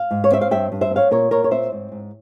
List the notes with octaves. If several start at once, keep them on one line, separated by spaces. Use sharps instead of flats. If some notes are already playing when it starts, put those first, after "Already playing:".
Already playing: F5
G#2
C#5
C4 E5
F5
G2 E5 G5
G2
C5 E5
C4
C#5 F5
A#2 A#4 C#5
A#2 A#4 C#5
C#5
C4 C5 E5
G#2
G#2